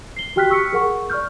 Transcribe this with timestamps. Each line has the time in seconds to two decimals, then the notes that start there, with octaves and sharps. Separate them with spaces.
0.16 C7 G7
0.36 F#4 G4 G5 F6 F#6 B6
0.50 C#6 E6 F6 B6 C#7
0.73 G#4 A#4 F#5 C#6
1.10 D5 C#6 F6 G6